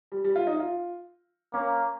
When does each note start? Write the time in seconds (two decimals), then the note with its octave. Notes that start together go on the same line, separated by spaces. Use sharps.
0.12 G3
0.24 G3
0.36 F4
0.47 D#4
0.60 F4
1.53 A#3 C#4